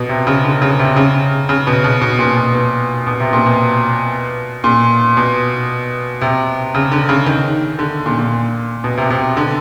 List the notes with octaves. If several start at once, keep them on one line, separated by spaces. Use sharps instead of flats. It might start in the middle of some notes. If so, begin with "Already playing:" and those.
Already playing: B2
C3
C#3
D3
C#3
C3
C#3
C#3
B2
B2
B2
A#2
B2
B2
B2
C3
A#2
B2
A#2
B2
C3
C#3
D3
C#3
D#3
D3
A#2
A#2
B2
C3
C3
D3